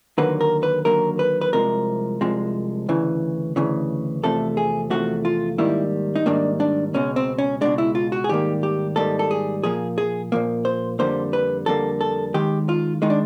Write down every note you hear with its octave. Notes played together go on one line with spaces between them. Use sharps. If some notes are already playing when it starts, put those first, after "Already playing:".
D#2 D3 F#3 A#3 B4
A#4
B4
D#2 D3 F#3 A#3 A#4
B4
B4
C2 C3 F3 G#3 A#4
C2 C3 F3 G#3
D2 C#3 E3
D2 C#3 E3
E2 C3 F3 A3 A4
G#4
E2 C3 F3 A3 F#4
F4
G#2 D#3 G3 A#3 E4
D#4
G#2 D#3 G3 A#3 D4
D4
C#2 B2 G#3 C#4
C4
C#4
C#2 B2 G#3 D4
E4
F4
F#4
G#4
G#2 D#3 G3 A#3 G4
G4
G#2 D#3 G3 A#3 A4
A4
G#4
A#2 F3 A#3 G#4
G#4
A#2 F3 A#3
C5
F2 D3 G3 A#3 C5
B4
F2 D3 G3 A#3 A4
A4
D#2 D#3 G#3 G4
F4
D#3 G#3 D#4
D4